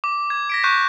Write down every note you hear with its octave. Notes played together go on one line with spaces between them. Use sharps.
D6
G#6
A#6 B6 D7
C#6 F#6 G6 A#6 C7 E7